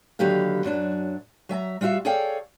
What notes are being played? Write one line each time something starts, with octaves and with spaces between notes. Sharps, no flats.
D#2 D3 F#3 G4 B4 F5
F#2 F#3 D4
F#3 E5 G#5 A#5
G3 F4 F#4 E5 F5
G#4 A4 C#5 D5 F5 G5